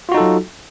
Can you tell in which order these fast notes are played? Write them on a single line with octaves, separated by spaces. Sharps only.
F4 F#4 D#4 A4 F#3